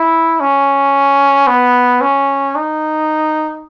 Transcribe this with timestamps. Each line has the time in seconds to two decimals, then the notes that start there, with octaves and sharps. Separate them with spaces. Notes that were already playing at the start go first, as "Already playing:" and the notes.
Already playing: E4
0.40 C#4
1.47 B3
2.01 C#4
2.55 D#4